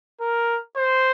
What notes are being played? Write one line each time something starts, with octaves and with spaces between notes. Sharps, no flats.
A#4
C5